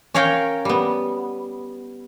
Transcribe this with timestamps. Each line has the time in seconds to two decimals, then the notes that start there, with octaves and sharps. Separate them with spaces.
0.14 C#4 A#4 C#5 F5 G5
0.65 G3 B3